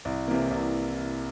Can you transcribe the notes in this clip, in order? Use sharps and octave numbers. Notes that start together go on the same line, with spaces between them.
C2
C3 E3 A#3
C2